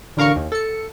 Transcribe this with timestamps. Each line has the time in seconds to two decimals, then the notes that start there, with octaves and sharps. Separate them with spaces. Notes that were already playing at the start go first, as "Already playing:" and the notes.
0.17 A1 D3 A#4 F5 A#5 C#6
0.36 D#2
0.52 A4 C#7